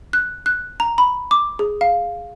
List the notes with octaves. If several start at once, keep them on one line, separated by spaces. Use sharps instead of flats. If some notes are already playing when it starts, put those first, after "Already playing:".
F#6
F#6
A#5
B5
D6
G#4
F5